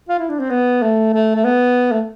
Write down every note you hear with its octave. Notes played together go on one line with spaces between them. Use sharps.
F4
E4
D4
C4
B3
A3
A3
A3
B3
A3